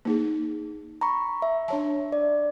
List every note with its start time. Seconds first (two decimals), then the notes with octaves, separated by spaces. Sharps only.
0.05 A#3 D#4 G#4
1.01 A#5 B5 C#6
1.42 E5
1.68 D4 C#5 A5
2.12 D5